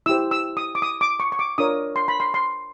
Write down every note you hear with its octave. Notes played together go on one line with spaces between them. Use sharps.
E4 G4 C5 E6
E6
D#6
D6
D#6
D6
C#6
C#6
D6
D4 F4 A#4 C#5 D#6
C6
B5
C6
C6